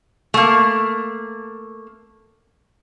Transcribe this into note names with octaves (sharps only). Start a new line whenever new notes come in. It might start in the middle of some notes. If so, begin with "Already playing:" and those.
A3 A#3